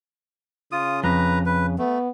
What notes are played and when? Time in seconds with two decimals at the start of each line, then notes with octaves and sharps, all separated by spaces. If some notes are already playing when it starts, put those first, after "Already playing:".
0.72 C#3 F4 D#6
1.04 F2 B4 A#5
1.46 C#3 B4
1.78 A3 B3